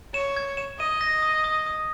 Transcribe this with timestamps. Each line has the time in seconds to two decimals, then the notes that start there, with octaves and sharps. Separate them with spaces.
0.14 C#5 E7
0.37 G#6
0.57 E7
0.79 D#5 D#7
1.01 A#6
1.22 D#6
1.44 D#6
1.66 D#6